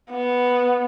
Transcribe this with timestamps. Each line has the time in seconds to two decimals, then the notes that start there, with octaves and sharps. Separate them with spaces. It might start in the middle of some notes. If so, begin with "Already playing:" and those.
0.11 B3